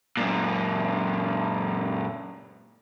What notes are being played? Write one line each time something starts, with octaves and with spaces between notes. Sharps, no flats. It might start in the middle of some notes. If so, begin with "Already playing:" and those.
F#2 A#2